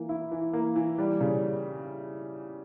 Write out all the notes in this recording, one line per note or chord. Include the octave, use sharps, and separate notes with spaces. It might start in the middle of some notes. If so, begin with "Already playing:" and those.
Already playing: E3 A#3
E4
E3
A#3
E3
G3
C#3